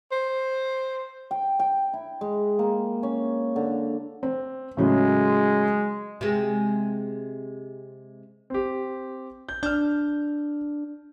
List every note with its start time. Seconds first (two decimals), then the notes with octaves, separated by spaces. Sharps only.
0.12 C5
1.31 G5
1.59 G5
1.93 E4
2.21 G#3
2.59 A#3
3.03 C#4
3.56 D3
4.23 C4
4.77 A2 C#3 F#3 G#3
6.21 C3 G#3
8.50 C4 G4
9.49 G6
9.63 D4 F6 G6